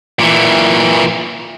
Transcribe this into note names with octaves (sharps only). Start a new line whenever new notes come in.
A#2 E3